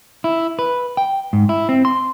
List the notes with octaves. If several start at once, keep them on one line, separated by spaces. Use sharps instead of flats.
E4
B4
G5
G#2
E4
C4
C6